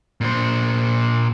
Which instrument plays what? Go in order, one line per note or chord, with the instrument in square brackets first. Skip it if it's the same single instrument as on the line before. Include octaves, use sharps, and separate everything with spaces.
[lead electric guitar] A#2 C5